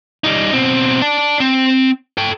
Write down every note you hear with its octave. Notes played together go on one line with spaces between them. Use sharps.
G3 D#4
B2 C4
D5 A5
C4
A4 G5